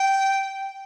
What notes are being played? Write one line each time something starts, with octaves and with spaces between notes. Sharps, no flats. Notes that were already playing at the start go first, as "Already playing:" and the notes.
Already playing: G5